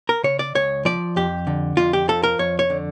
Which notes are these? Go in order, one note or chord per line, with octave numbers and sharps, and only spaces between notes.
A#4
C#3 C#5
D5
C#2 C#5
F3 D5
F2 G4
D3
F2 F4
G4
F3 A4
A#4
F2 C#5
C#5
D3